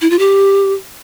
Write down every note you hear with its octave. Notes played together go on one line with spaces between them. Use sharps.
E4
F4
G4